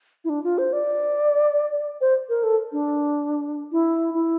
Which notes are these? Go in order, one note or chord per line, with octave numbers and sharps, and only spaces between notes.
E4
D4
F4
C5
D5
C5
A#4
A4
D4
E4
E4